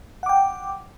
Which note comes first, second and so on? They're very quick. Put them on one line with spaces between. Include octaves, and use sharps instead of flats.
F#5 D6 G5